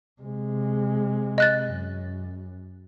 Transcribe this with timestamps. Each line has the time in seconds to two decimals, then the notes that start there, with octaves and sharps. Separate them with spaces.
0.22 C3 G#3
1.38 D#5 F#6 A6
1.72 F#2